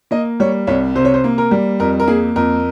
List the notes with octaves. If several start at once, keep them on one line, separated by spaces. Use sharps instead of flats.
A#3 D#5
G3 C#5
C2 C#5
C3 C5
C#5
C5
A#3
A#4
G3
F2 A#4
A#4
A#3 G#4
F2 A#4